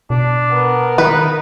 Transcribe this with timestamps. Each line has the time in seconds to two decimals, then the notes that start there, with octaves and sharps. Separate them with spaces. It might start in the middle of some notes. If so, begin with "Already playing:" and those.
0.10 B2 D4
0.51 B3 A#4
0.98 D#3 D#4 B4